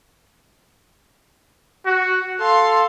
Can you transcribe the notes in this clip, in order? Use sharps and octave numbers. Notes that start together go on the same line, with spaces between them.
F#4
A4 F5 C6